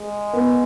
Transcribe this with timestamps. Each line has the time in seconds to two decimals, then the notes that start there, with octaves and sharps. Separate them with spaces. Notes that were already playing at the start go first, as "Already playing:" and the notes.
Already playing: G#3
0.33 B3